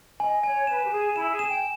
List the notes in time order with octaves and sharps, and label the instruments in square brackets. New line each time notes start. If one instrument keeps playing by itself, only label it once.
[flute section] D#5 [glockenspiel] G#5
[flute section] C#5 [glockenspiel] G#5
[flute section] B4 [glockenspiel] E7
[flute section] G4
[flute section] G#4 [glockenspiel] G#5
[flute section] E4 [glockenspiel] E7
[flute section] G#4
[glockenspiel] E7
[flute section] G5